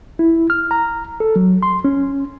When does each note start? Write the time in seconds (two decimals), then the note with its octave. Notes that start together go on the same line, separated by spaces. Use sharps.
0.19 E4
0.50 F6
0.71 A#5
1.20 A4
1.36 F#3
1.63 C6
1.84 C#4